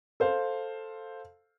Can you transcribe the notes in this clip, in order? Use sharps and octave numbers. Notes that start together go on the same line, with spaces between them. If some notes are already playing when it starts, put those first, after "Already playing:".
A4 C5 F5